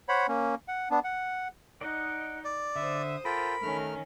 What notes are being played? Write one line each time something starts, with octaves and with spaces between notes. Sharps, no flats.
C5 C#5 F#5 B5
A#3 C#4
F#5
B3 D4
F#5
D#4 D5 D#5 F#5
D5
D3 C5 E5 D#6
F4 A4 A#4 G5 B5
D#3 A3 C#4 F6